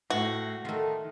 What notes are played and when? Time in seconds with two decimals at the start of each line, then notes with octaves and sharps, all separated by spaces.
0.10 A2 F#4
0.65 D#3 A3 F4